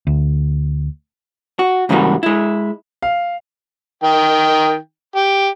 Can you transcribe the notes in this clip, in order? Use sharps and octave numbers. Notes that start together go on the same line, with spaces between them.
D2
F#4
G#2 C#3 E3 G3 A#3 F#4
G#3 E4
F5
D#3 G5
G4